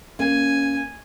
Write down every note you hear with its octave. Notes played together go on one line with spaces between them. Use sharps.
A#3 C#4 G#5